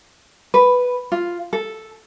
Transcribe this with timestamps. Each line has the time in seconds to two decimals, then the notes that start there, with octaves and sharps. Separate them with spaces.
0.54 B4
1.12 F4
1.53 A4